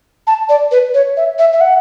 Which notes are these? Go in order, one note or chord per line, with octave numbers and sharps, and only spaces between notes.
A5
D5
B4
C#5
E5
E5
E5
F#5